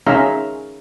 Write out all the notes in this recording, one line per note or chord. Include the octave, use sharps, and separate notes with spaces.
C#4 D#4 G#4 E5 F5 A#5